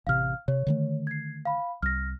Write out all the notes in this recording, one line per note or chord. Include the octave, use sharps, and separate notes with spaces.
A1 C3 F5 F6
C3 C#5
D3 D#3 A3
G#6 C7
F5 B5
C2 F6 A#6